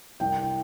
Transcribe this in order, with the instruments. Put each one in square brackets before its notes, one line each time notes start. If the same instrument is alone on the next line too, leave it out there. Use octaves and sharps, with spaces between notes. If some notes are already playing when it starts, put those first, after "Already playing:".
[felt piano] C2 G5